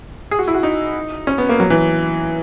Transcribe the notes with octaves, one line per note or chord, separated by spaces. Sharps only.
G#4
F#4
E4
F#4
D#4
C#4
B3
A#3
F#3
E3